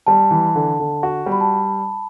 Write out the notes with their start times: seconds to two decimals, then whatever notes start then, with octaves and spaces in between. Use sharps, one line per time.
0.07 G3 A5
0.31 E3
0.55 D3
0.79 D3
1.03 F#4
1.26 G3
1.32 B5
1.41 A5